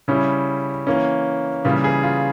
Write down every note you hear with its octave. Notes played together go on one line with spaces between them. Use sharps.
C#3 G3 C#4 E4
E3 A#3 C#4
C#3 E3 G3 A#3 F4
G#4
F4